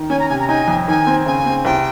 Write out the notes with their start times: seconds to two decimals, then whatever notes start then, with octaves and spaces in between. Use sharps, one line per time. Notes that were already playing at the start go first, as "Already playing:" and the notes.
Already playing: D#3
0.10 C#4 G#5
0.19 A#5
0.29 C3 G#5
0.40 A#5
0.48 D#4 G#5
0.68 F2
0.88 D#3 G#5
1.07 C4
1.26 C#3 G#5
1.46 C4
1.65 C2 G5